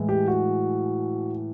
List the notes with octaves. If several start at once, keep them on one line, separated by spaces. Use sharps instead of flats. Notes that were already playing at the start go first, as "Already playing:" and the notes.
Already playing: A2 E3 G#3
G4
F#4